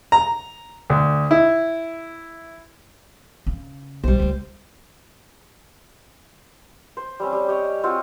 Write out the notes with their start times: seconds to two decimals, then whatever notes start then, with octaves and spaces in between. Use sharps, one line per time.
0.12 A#5
0.90 D2
1.31 E4
3.46 C#3 C#4
4.04 B1 G3 C#4 C5
4.19 C#2 A3
6.97 C5
7.20 G3 C4 C#4
7.33 G3
7.48 G4 C#5 D#5
7.84 C4 F4 F#4